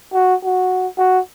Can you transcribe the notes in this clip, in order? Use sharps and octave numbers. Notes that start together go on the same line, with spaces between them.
F#4
F#4
F#4